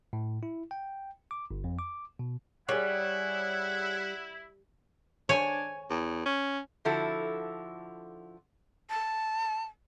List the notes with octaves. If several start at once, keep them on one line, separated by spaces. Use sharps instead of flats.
A2
E4
G5
D6
G1
F2
D6
B2
G3 E4 G#4 C#5 F#5
D4 C#5 G#5
E2
C#4
D3 F3 E4 F#4 A4
A5